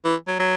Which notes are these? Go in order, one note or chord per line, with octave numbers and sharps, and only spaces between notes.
E3
F#3
F#3